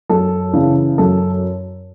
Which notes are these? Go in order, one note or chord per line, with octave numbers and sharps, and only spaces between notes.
F#2 A4
C#3 E3
F#2 A4